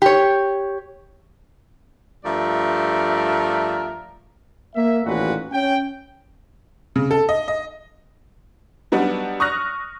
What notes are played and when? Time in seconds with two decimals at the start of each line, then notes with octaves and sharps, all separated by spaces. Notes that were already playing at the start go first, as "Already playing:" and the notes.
0.02 G4 C#5
2.25 G2 F3 A3 A#4 D5 E5
4.75 A#3 E5
5.06 A1 D#2 A#2 F#4 B4
5.52 C#4 G5
6.96 C#3
7.11 A4
7.29 D#5
7.48 D#5
8.92 F#3 G3 B3 D4 D#4 F#4
9.40 C#6 D#6 F6 F#6 A#6